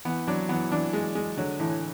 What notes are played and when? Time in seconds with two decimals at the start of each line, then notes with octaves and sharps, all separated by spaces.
0.05 E3 B3
0.27 F#3 D4
0.49 E3 B3
0.71 E3 D4
0.93 G#3
1.15 G#3
1.37 D3 F#3
1.60 A2 E3